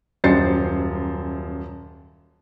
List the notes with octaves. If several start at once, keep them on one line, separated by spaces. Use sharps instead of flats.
D#1 F#2 C5 A6 C7 C#7